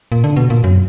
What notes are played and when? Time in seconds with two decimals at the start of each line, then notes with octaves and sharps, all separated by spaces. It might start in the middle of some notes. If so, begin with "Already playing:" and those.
0.12 A#2
0.24 D3
0.36 B2
0.50 A#2
0.64 F#2